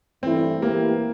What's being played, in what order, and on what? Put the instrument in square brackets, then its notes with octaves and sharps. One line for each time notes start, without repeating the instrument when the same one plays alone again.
[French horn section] G2 E3 A3 E4 [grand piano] C4
[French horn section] E3 A3 E4 G4 [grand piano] A#3